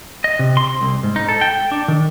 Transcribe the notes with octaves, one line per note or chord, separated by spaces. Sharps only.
D#5
C3
C6
C2
G#2
D#4
A4
G5
D4
D#3